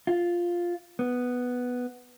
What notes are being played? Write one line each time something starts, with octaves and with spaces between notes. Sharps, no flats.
F4
B3